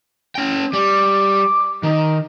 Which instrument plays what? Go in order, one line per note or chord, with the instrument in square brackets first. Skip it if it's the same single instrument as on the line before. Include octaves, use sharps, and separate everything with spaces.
[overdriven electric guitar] C#4 G5
[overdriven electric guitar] G3 [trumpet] D6
[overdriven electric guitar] D#3 [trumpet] D#4